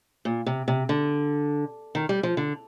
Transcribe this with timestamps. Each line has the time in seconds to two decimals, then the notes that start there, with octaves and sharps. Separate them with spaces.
0.25 A#2
0.46 C3
0.68 C3
0.89 D3
1.95 D#3
2.09 G3
2.23 F3
2.37 D3